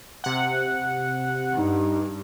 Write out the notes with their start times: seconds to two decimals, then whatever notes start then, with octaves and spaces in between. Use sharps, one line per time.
0.24 C3 F#5
1.56 G2 D#4